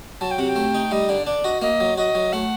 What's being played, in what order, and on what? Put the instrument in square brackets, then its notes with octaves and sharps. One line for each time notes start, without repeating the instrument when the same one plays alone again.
[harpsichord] F#3 [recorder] A5
[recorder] G5
[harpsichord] C3 [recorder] F#5
[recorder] G5
[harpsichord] A3
D#4
[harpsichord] G3 [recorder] D#5
[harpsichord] D3 [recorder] D5
[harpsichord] D4 [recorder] D5
[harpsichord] F#4 [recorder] D#5
[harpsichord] A#3 [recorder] D#5
[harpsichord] F#3
[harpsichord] F#4 [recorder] D#5
[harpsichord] F#3
[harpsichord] A3 [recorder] F#5